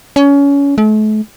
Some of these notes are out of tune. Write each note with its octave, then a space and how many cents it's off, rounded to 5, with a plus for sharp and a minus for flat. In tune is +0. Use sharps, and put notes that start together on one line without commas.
C#4 +25
A3 -40